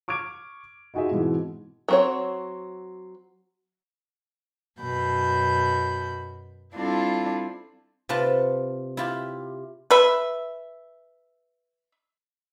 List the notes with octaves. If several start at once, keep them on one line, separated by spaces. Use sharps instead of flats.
C#6 D6 F6 G#6 D7
D#4 F4 F#4 G#4 D#5 E5
G#2 B2 E3 G#3 C4
F#3 C4 C#5
F#2 B2 F#4 B5 G6
G3 C4 D4 E4 F4 A4
C3 F4 B4 A5
E4 F4 G4
B4 E5